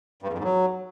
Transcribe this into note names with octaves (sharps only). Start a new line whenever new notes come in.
G2
E2
F2
G#2
F#3